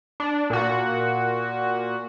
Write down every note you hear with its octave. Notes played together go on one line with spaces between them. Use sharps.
D4
A#2 F#4